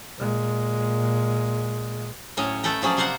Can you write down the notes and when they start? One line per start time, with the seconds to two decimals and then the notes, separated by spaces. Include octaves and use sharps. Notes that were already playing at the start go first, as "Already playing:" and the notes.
0.17 A#2 G#3
2.37 A2 F#3 C#4 C#5 D#5
2.63 A3 A4 B4 G5 A#5
2.82 F3 F#3 C#4 G#4 D5
2.97 C3 A#3 C5 F5 F#5 A#5